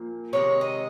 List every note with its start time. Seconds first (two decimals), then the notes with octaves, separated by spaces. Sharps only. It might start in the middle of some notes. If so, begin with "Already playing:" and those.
Already playing: A#2 F3 A#3
0.33 C3 D#3 G#3 C#5
0.61 D#5